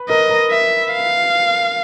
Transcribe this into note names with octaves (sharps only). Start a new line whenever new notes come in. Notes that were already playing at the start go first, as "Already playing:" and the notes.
Already playing: B4
A#4 D#5
A#4
E5
F5